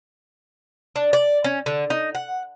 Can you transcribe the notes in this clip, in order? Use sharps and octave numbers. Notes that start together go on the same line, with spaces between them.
D4
D5
C#4
D3
D#4
F#5